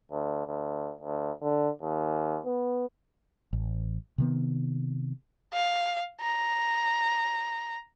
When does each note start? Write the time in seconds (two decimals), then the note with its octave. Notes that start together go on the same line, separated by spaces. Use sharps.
0.11 D2
0.47 D2
1.01 D2
1.41 D3
1.82 D#2
2.45 B3
3.53 A1
4.18 C3 D#3 B3
5.54 F5
6.21 A#5